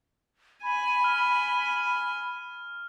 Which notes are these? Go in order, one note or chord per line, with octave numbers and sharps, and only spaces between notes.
G#5 B5
F6